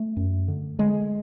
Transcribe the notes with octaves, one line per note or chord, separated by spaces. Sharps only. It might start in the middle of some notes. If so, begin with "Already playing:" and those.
Already playing: A3
F#2
D3
D3 G#3